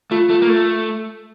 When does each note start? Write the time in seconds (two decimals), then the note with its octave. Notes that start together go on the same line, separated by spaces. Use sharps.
0.11 A3 F4
0.30 A3
0.42 A#3
0.49 A3